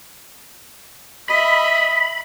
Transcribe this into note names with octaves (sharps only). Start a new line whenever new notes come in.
D#5 E5 B5